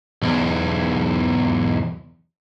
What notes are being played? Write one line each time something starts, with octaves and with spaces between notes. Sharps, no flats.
B1 E2